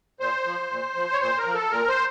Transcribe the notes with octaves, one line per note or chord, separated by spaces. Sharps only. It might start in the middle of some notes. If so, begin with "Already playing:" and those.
A#2 C5
F3
A#2
F3
C#5
A#2 C5
A#4
F3
A4
A#2 A#4
C5